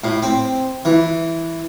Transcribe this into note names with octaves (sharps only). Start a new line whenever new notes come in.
A2
C4
E3